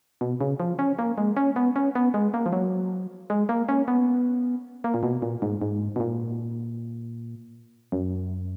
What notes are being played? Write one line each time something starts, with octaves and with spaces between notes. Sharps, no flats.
B2
C#3
F3
C#4
A#3
G#3
C#4
B3
C#4
B3
G#3
A#3
F3
F#3
G#3
A#3
C#4
B3
A#3
A#2
B2
A#2
G#2
G#2
B2
A#2
F#2